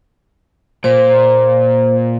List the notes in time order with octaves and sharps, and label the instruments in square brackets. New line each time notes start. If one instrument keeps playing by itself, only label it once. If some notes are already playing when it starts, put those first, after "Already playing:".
[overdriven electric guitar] A#2 [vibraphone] C5